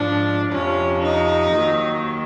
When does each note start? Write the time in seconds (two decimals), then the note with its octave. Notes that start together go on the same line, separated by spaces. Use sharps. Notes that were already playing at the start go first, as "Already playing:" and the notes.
Already playing: G#2 F3 D4
0.51 F2 C3 F3 C#4
1.03 D#4
1.54 D#2 D#3 F#3